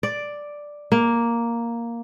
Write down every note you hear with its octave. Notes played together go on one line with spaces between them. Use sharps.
D5
A#3